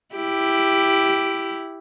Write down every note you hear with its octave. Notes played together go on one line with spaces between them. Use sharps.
E4 G4